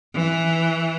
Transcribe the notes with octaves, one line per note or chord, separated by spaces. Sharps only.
E3